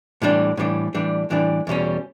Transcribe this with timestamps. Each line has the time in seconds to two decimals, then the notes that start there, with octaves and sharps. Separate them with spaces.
0.22 A2 E3 G3 D4
0.57 A2 E3 G3 D4
0.94 A2 E3 G3 D4
1.30 A2 E3 G3 D4
1.67 E2 B2 G3 C#4